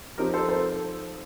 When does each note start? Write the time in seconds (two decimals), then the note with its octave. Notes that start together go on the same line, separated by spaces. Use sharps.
0.18 F3 C4 D#4 G4 A#4
0.34 A4 C5
0.49 A4 C5